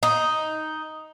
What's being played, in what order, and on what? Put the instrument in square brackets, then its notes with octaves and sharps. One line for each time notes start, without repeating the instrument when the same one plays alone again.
[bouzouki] D#4